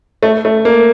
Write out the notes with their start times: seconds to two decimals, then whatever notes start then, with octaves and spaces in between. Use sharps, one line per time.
0.23 A3
0.45 A3
0.65 A#3